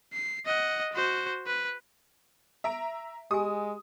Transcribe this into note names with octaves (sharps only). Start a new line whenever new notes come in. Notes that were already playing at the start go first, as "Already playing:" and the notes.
C7
D#5 F#5
F#4 C5
B4
E5 A#5 D7
G#3 G4 G#5 D#6